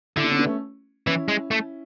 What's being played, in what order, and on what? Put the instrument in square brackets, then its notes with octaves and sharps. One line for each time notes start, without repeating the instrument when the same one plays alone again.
[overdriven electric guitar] D3 [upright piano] E4
[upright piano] D4
C#4
B3 D4
A3 C#4
[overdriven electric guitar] E3 [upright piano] C#4 E4
[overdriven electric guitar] G#3
A3